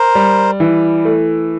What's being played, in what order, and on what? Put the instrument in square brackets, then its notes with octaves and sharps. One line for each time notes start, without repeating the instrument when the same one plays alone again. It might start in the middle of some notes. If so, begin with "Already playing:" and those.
Already playing: [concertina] A#4 C5
[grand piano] G3
E3
A3